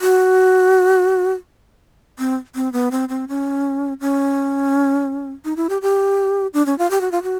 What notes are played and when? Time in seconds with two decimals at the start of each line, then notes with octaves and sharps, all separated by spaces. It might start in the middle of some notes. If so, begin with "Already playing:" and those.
0.01 F#4
2.19 C4
2.55 C4
2.73 B3
2.91 C4
3.09 C4
3.28 C#4
4.01 C#4
5.45 D#4
5.57 E4
5.69 G4
5.82 G4
6.54 D4
6.66 C#4
6.79 F4
6.91 G4
7.01 F#4
7.12 F4
7.23 F#4